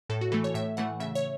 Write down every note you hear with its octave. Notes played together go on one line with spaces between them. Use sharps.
A2 A4
F#4
E3 A3 A4
C#5
A2 E5
E3 A3 F#5
C#3 E5
C#5